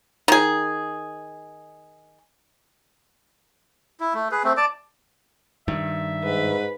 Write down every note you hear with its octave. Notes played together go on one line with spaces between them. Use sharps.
D#3 G#4
E4
A3
G#4 B4
A3 C4
D5 A5 D6
G2 D#3 E5
G#2 B4